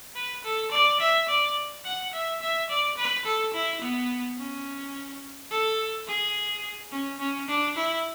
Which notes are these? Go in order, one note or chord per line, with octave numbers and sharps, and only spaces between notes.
B4
A4
D5
E5
D5
F#5
E5
E5
D5
B4
A4
E4
B3
C#4
A4
G#4
C#4
C#4
D4
E4